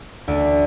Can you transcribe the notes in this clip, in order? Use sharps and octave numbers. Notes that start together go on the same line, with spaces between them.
D2